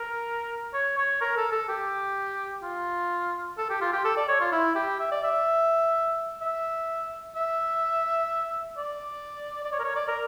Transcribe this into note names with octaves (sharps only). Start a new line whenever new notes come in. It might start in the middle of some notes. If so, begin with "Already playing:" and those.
Already playing: A#4
C#5
C#5
A#4
A4
A4
G4
F4
A4
G4
F4
G4
A4
D5
C#5
F4
E4
G4
E5
D5
E5
E5
E5
D5
D5
C#5
A#4
C#5
D5
A#4